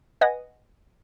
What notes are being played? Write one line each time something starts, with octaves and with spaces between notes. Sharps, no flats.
B4 D#5 F#5 G#5 A#6